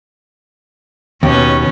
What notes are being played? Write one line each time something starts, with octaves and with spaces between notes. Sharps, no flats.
D#2 B2 C#4